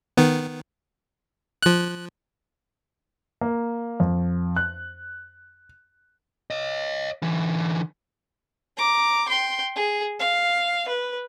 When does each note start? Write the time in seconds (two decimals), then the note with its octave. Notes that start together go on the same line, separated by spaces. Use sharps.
0.17 D#3 B3
1.63 F3 F#6
3.41 A#3
4.00 F2
4.56 F#6
6.50 C#5 D#5
7.22 D3 E3
8.77 A#5 D6
9.28 G5 C6
9.76 G#4
10.20 F5
10.88 B4